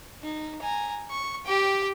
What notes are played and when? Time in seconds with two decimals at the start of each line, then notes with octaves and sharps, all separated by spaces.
0.22 D#4
0.61 G#5 A#5
1.10 C#6
1.46 G4 G5